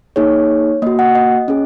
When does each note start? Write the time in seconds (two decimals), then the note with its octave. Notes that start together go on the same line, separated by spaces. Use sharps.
0.16 A#3 D#4 G#4 C#5
0.82 A#3 F#4 D#5
0.99 F#5
1.15 D#5
1.48 C#4 G#4